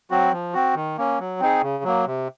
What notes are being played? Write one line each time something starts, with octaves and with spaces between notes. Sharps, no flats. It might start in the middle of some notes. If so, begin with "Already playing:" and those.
F#3 C4 F#4
F3
C4 F#4
D#3
A#3 C#4
F#3
C4 D#4 G#4
C#3
F#3 A#3
C3